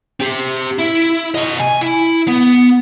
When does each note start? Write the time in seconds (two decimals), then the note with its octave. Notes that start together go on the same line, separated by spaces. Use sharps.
0.20 C4 G4
0.79 E4
1.35 C3 D#5
1.60 G#5
1.81 E4
2.28 B3